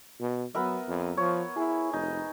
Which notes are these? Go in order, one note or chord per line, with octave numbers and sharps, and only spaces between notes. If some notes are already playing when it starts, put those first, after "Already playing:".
B2
F#3 B3 A#4 E5
F2
F3 C#5
E4 G#4
F1 D#4